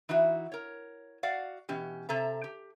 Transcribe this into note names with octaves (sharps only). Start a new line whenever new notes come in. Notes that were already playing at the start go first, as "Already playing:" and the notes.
E3 D#4 E4 F#4
A#4 C#5
F#4 D5 F5 F#5
B2 E3 C#4 G4
C3 A4 E5 A#5
G4